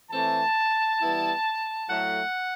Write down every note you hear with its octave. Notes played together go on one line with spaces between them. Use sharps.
E3 A3 C4 A5
E3 G3 B3 E4
A2 F#3 A3 F#5